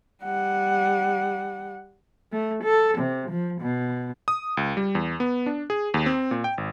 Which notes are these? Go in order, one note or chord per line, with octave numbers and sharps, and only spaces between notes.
G3 F#5
A3
A4
C3
F3
B2
D#6
C#2
G3
E2
B3
D4
G#4
D#2
C4
A#2
G5
G#1